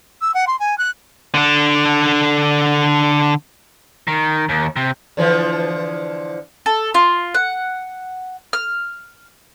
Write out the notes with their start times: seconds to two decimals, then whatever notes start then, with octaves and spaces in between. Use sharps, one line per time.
0.21 E6
0.34 F#5
0.47 C6
0.59 G#5
0.78 F#6
1.34 D3 D4
4.08 D#3
4.49 D#2
4.76 C3
5.17 D3 E3 F3
6.66 A4
6.94 F4
7.34 F#5
8.53 F6